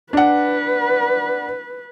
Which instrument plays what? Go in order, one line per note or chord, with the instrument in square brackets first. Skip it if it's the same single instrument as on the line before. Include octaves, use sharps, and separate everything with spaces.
[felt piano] D4 F#5 [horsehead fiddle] B4